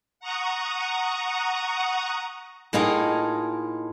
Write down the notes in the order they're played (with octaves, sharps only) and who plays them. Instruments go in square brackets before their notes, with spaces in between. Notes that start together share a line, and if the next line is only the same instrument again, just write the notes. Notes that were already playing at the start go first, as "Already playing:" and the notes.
[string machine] F#5 A#5 C#6 D#6
[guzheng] A2 A#3 D#4 F4 G#4